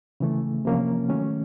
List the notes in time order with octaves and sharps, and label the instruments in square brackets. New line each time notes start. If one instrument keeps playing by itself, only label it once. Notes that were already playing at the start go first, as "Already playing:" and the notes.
[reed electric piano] C#3 E3 A3
C3 F3 A#3 C#4
D#3 F#3 A3 C#4